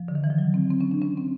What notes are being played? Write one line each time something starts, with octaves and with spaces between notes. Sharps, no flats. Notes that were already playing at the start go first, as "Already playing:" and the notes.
Already playing: F3
D3
D#3
E3
F3
F#3
C4
C4
C#4
D4
C#4
C4